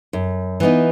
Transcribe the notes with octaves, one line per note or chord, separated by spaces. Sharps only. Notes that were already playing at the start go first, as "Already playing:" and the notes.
F#2
E3 B3 D#4